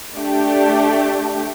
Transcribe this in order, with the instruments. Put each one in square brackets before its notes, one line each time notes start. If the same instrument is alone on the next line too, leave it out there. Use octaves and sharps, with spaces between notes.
[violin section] A3 D4 G4